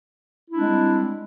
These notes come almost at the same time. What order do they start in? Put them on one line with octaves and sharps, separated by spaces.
E4 D4 G#3 C4 G3